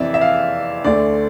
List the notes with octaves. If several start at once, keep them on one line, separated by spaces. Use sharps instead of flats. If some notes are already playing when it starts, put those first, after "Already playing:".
Already playing: F2 C3 E3 D5 E5
E5
F5
D2 D3 A3 D5